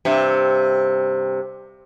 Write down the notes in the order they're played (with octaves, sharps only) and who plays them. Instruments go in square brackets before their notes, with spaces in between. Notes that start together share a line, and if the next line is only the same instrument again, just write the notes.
[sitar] G2 C3